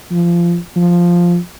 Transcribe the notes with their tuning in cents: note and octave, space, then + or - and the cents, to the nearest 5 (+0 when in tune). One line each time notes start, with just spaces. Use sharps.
F3 -20
F3 +0